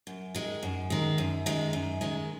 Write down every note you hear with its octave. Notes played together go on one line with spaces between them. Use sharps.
F#2
D#3 G#3
F#2
D#3 G#3
F#2
D#3 G#3
F#2
D#3 G#3